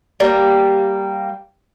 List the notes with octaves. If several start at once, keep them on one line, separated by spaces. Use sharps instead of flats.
G3 A#3